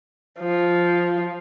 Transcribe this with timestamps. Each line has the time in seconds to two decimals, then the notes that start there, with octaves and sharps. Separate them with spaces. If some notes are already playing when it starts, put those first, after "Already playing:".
0.40 F3